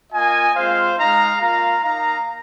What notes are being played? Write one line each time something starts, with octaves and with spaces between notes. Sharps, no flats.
A#3 F4 D#5 G#5
G#3 C4 F4 C5 F5
G#3 D#4 F5 A#5
A#3 F4 F5 A#5
A#3 D#4 F5 A#5